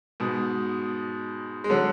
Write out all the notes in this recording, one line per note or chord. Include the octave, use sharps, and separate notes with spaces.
G#2 B2
G#3
D3 F#3